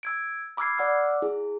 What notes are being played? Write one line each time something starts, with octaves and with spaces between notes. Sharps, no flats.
E6 G#6 D7
B5 D6 E6 F6 G#6 C7
D5 F#5 D6 E6 F6
E4 G#4